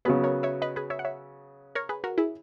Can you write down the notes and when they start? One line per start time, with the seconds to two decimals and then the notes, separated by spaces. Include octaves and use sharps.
0.05 C#3 F#3 B3 G#4 B4
0.24 A#4 C#5
0.43 C#5 E5
0.62 B4 D#5
0.76 G#4 B4
0.90 C#5 E5
0.99 F#5
1.05 C#5 E5
1.75 A#4 C#5
1.89 G#4 B4
2.04 F#4 A#4
2.18 E4 G#4